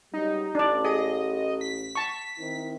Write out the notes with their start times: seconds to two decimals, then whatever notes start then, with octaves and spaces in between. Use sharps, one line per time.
0.14 C#2 F#3 G3 D#4
0.55 A1 D4 D5
0.85 G#4 D#5
1.61 B6
1.95 A5 C#6
2.38 D#3 C4 E4